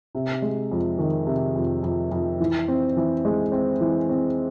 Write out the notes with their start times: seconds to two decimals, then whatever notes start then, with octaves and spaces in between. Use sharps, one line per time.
0.15 C3
0.42 G#3
0.71 F2
0.99 D#3
1.27 C3
1.56 F2
1.83 F2
2.11 F2
2.40 E3
2.68 C4
2.97 E3
3.25 G#3
3.52 C4
3.81 E3
4.09 C4